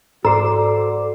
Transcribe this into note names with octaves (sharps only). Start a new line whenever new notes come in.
G#2 F#4 A4 C5 D5 A#5 D6